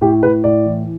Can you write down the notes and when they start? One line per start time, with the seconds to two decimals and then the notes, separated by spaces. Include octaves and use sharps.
0.01 A2 G4
0.23 A2 B4
0.44 A2 D5
0.66 E3